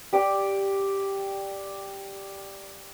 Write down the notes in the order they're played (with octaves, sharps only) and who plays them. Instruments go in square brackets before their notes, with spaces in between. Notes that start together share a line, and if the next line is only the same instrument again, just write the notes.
[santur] G4 D5 G5